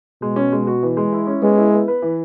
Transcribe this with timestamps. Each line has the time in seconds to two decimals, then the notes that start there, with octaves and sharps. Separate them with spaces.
0.22 B2 G#3
0.36 C#4
0.52 G#3
0.67 F#4
0.83 E3
0.97 G#3
1.13 E4
1.27 C#4
1.42 G#3 B3
1.58 E4
1.73 B3
1.88 B4
2.02 E3